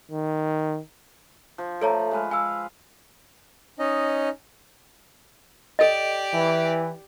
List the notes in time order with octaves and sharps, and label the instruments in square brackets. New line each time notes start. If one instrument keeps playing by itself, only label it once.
[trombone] D#3
[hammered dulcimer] F3
[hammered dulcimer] A3 [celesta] A4 C#5 A#5
[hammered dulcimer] G#3 B4 F5
[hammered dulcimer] F5 [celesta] G#5 E6
[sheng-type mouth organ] C#4 D#4 D#5
[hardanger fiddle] G4 D5 [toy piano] A4 D#5
[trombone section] E3